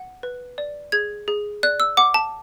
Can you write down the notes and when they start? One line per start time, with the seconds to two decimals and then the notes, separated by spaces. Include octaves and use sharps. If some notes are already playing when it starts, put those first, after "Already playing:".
Already playing: F#5
0.23 B4
0.58 D5
0.92 G#4 G#6
1.28 G#4
1.63 D5 F#6
1.80 E6
1.97 F#5 D6
2.14 A5